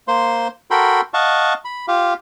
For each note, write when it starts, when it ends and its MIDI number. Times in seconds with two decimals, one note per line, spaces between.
0.08 0.48 58
0.08 0.48 72
0.08 0.48 84
0.71 1.01 66
0.71 1.01 69
0.71 1.01 70
0.71 1.01 79
0.71 1.01 83
0.71 1.01 84
1.14 1.53 75
1.14 1.53 77
1.14 1.53 78
1.14 1.53 81
1.14 1.53 85
1.65 1.86 83
1.88 2.14 65
1.88 2.14 67
1.88 2.14 77